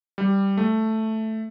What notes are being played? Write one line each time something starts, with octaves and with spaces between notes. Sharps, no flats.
G3
A3